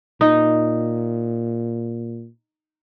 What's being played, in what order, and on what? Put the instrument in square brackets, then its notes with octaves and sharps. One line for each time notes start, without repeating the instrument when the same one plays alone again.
[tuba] A#2 [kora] D#4